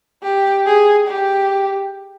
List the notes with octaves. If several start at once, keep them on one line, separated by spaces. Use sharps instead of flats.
G4
G#4
G4